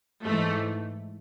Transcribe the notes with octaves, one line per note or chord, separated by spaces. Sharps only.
G#2 E3 A3